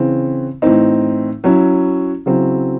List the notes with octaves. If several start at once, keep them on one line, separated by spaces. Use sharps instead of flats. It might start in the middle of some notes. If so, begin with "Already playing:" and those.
Already playing: C#3 E3 C4
A2 E3 C4 D#4
F#3 C#4 E4
C#3 F#3 C4 E4